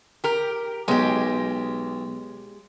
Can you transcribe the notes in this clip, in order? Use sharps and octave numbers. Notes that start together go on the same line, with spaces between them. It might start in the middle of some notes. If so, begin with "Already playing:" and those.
G4 A#4
B1 G#3 G4